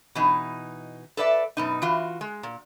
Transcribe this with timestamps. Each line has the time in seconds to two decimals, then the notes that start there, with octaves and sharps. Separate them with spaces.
0.15 B2 E3 D#4
1.17 A4 B4 D5 E5
1.57 F#2 B2 D#4
1.82 E3 F4 F#4
2.21 G#3
2.43 A#2